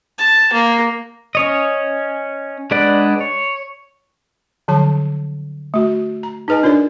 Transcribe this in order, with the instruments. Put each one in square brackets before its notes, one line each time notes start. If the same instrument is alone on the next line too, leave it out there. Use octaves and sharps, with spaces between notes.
[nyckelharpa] A5
A#3
[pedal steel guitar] C#4 C#5 D#5
G#3 D4 B4 D5 F#5
C#5
[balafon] D3 F3 F#3 C#5 A5
A3 F#4
A#5
D#4 G#4 B4 D#5 G#5
D4 F4 A#4 C#5 D5